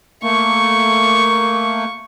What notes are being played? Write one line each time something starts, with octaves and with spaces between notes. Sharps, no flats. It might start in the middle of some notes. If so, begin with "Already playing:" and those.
A3 A#3 C#6